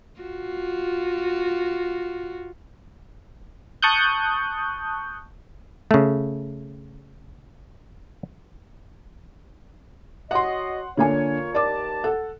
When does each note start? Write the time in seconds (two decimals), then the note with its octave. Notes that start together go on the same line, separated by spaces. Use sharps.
0.21 F4 F#4
3.82 A5 C#6 D#6 F#6 G6
5.91 C#3 A3
10.31 F#4 C#5 D#5 F#5 C6
10.97 D3 A#3 F4 A#4 C#5 G#5
11.55 D#2 D5 A5 D6
12.04 A4 F#5